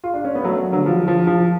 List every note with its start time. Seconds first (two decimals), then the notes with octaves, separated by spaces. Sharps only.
0.04 F4
0.14 D4
0.25 C#4
0.35 B3
0.44 F#3 A3
0.72 D3 F#3
0.86 F3
1.08 F3
1.27 F3